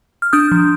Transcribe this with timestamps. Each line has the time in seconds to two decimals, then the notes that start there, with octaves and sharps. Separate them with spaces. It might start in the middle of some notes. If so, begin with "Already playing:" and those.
0.22 F6
0.33 D4 D#6 G6
0.52 F3